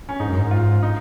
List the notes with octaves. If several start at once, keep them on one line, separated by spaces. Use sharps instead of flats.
C#4
G#2 D#4
F#2
G#2
F4
D#4